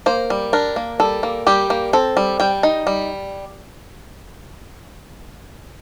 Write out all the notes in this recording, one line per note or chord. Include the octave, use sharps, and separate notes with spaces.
A#3 C5
G3
D4 A#4
A#3
G3 A4
A#3
G3 G4
A#3
C4 A4
G3
G3 G5
D#4
G3